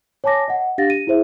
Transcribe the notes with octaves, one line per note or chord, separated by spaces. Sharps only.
C#5 G#5 A5 D6 A#6
D#5 F#5
D4 G4 F5 A6 A#6
D#7
E4 G#4 C5 E5